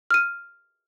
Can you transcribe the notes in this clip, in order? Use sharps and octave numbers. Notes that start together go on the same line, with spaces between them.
F6 D#7